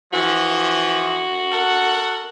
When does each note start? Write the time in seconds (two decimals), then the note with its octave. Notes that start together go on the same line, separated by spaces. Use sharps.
0.13 E3 F3 F#4
1.51 A4 A#4 F#5